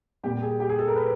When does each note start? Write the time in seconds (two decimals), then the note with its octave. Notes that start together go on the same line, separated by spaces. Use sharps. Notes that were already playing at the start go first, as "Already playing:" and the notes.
0.23 A#2 G3 G4
0.42 G#4
0.60 G4
0.69 G#4
0.79 A4
0.88 A#4
0.96 B4